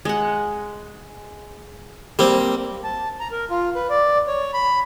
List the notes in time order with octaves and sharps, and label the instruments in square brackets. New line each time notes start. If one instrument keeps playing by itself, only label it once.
[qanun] G#3 F#5
[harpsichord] G3 C4 [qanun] A#3
[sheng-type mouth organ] A5
A#5
A#4
F4
B4
D5
C#5
B5